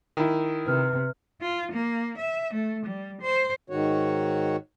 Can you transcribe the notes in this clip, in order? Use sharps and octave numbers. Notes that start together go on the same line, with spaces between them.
D#3 E4
C3 B4 F6
F4
A#3
E5
A3
G3
C5
G#2 D#3 F#4 C#5